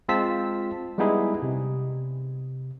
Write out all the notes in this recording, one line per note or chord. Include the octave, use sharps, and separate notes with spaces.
G#3 C4 F4 A5 E6 B6
G3 G#3 B3 D#4 E4 G#4
C3